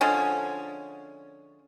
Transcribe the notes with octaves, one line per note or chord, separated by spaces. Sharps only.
D3 F3 G#3 C#4